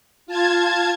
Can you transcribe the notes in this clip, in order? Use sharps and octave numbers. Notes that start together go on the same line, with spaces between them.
F4 A5 G#6